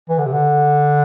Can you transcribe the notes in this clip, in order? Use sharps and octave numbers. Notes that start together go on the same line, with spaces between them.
E3
D3
C3
D3